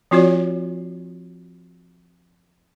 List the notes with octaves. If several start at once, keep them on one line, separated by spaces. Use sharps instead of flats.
F3 C4 F4 F#4 C#5 D5